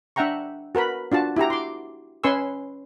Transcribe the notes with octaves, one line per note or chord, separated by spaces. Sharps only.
D4 E5 F#5 G5 A#5 C#6
F#4 A#4 B4 B5
D4 F4 F#4 A5
E4 F#4 G4 A#5
C6 D6
C#4 B4 G#5 C6 C#6 E6